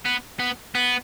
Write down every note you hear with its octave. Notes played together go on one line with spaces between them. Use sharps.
B3
B3
B3